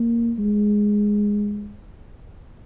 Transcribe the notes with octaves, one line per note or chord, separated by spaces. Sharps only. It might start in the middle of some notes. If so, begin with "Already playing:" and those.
Already playing: A#3
G#3